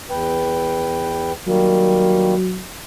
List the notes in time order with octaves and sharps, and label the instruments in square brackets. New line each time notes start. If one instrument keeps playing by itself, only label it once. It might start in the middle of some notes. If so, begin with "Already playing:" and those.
[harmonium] E2 B4 G5
[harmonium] D#3 G3 A#3 [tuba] F#3